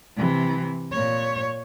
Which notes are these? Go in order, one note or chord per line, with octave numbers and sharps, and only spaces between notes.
C3 E3
A#2 C#5